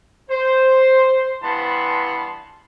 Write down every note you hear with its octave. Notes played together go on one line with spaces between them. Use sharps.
C5
G2 E3 B3 A5 B5 C6